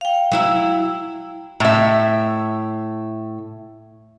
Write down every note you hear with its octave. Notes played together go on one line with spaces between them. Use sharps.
F5 G5
F#3 E4 E5
A2 E5